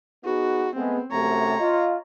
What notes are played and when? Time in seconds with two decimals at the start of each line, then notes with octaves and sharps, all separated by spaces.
0.25 B3 D#4 F#4 G#4
0.76 G#3 A3 B3 C4
1.12 F#2 C3 A3 C#5 A#5
1.60 F4 D#5